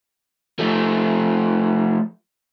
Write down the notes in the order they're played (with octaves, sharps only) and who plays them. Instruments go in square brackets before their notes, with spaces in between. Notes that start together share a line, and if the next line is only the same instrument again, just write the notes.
[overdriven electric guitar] F3 A3